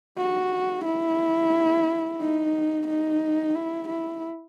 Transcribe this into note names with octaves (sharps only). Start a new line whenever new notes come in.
F#4
E4
D#4
D#4
E4
E4